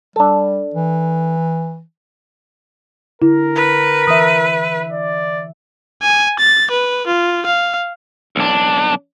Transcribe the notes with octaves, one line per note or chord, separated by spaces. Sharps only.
G3 D4 A4
E3
D3 E4 A#4
B4
E3 E5 D#6
D5
G#5
A6
B4
F4
F5
B1 D4